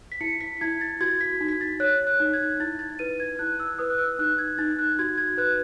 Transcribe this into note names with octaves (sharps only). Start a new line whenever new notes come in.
B6
E4 C#7
B6
E4 G#6
A6
F#4 G#6
B6
D#4
B6
A6
C#5 F#6
F#6
D#4
G#6
E4 A6
A6
B4 D#7
G#6
E4 F#6
E6
B4 D#6
F#6
E6
D#4 F#6
G#6
D#4 A6
F#6
F#4 G#6
G#6
B4 F#6